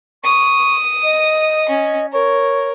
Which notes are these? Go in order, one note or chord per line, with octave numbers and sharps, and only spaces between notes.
C#6 D#6
D#5
C#4
A#4 C#5